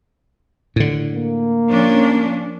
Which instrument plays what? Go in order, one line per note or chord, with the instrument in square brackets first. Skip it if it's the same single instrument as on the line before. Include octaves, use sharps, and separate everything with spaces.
[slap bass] A2 D3
[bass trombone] A#3
[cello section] F3 C#4 D4